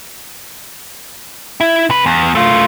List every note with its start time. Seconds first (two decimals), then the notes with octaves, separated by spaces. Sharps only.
1.60 E4
1.90 C3 B4
2.06 E2
2.35 A3 F4